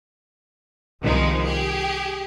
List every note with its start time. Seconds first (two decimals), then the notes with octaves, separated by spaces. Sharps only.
1.02 C2 D#3 F3 G#3 D#4
1.45 G4 G#4